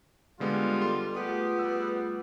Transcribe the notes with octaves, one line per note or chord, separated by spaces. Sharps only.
D3 G3 G#3 B3 F4
A4 C6
A3 B3 F4 G4 G#4
G3 E6